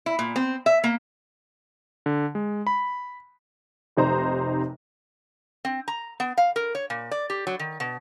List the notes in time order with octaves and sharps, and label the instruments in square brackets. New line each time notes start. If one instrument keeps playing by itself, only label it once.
[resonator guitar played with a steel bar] E4
A#2
C4
E5
A#3
[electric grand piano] D3
G#3
B5
[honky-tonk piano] F1 C3 D#4 C5 A#5
[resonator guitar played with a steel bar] C4
A#5
B3
F5
A#4
C#5
A#2
D5
G4
F#3
D#3
B2